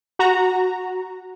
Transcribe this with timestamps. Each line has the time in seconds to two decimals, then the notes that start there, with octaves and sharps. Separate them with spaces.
0.19 F#4 A#5